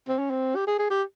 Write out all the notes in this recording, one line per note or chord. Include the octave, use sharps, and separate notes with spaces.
C4
C#4
C4
G4
G#4
G#4
G4